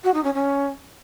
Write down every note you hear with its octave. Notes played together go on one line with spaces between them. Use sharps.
F#4
D#4
C#4
C#4